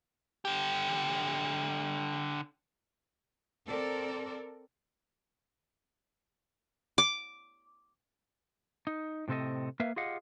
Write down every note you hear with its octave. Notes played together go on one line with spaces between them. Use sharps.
D3 G4
C4 A4 A#4 D5
D6
D#4
A2 C3 C4 A4 D#5
A#3 A#4 B4 E5 F5
F4 G4 G#4 D#5 F5 F#5